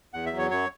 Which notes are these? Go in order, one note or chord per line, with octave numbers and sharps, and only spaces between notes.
E2 F#5
E5
F#3
C#5
F#2 C#5